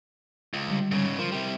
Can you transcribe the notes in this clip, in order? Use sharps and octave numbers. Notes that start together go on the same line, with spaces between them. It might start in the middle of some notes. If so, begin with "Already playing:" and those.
C#2
D3 G3
G#2 C#3
F3 A#4 C6
C3 G3